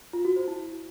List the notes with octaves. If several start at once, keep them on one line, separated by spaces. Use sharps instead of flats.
F4
F#4
C5
E4